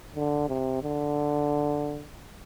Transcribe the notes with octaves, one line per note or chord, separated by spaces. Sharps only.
D3
C3
D3